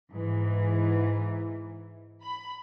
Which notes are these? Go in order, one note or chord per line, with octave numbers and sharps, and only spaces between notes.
G#2 E3
B5